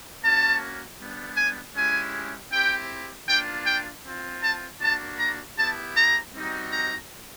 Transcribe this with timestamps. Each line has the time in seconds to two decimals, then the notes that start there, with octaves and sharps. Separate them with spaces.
0.22 A#3 C#4 F#4 A5
0.99 G3 B3 D4
1.36 G#5
1.75 G#3 C#4 E4 G4 G#5
2.51 C4 E4 G4 G5
3.28 A#3 D4 F4 G5
3.66 G5
4.05 C4 F4
4.42 A5
4.81 A#3 D4 F#4 A5
5.19 A#5
5.57 B3 E4 G4 A5
5.96 A#5
6.34 G3 C4 D#4 F#4
6.72 A#5